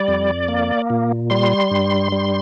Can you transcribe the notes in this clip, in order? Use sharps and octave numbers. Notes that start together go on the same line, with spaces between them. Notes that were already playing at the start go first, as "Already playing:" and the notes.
Already playing: G3 D5
F2
A#3
A#2
G3 C6
G2
G3